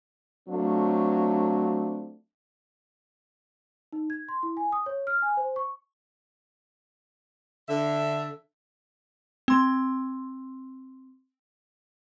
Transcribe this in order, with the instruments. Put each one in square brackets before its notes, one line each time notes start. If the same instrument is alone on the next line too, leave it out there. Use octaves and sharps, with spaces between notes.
[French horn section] F#3 A3 C4 D4 F4
[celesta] D#4
G#6
C6
E4
G#5
D#6
C#5
F6
G#5
C5
C#6
[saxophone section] D3 E5
[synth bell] C4 C6